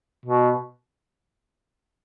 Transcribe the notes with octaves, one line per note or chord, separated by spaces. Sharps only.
B2